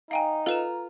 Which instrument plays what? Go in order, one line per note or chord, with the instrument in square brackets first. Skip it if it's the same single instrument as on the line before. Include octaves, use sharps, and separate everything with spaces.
[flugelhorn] D#4 [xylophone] F5 G5 G#5 [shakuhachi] A#5
[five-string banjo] F4 [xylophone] A4 B4 E7